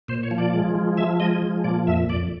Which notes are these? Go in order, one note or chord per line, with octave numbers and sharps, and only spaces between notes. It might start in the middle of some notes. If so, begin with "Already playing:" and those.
A#2 C5
C#5
F3
D5
G#3
F3
F3 E5
G#3 D#5
F3
A#2 D5
F2 E5
F2 D5